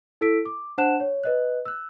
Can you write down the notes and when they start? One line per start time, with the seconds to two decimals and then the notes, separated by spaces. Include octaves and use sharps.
0.21 E4 A4 E6 B6 D7
0.45 D6
0.78 D4 C5 F#5 A5 F#6 E7
1.00 C#5
1.23 B4 D#5 F#6
1.65 E6 F#6